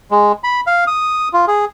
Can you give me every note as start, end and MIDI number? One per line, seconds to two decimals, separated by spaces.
0.11 0.32 56
0.44 0.61 83
0.67 0.84 77
0.87 1.28 87
1.33 1.45 65
1.47 1.65 68